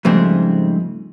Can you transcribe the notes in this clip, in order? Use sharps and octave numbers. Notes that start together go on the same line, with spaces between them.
G#2 C#3 F3 G3 A3 C4